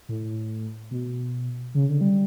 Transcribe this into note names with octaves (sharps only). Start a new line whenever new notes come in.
A2
B2
C#3
D3
G3